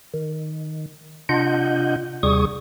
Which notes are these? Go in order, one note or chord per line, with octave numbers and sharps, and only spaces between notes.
D#3
C3 D4 F4 D#5 F#5 G6
D#2 C3 G3 G#4 C#6 D#6